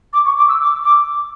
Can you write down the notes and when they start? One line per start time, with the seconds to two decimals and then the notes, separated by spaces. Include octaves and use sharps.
0.13 D6
0.25 C#6
0.37 D6
0.49 E6
0.61 D6
0.84 D6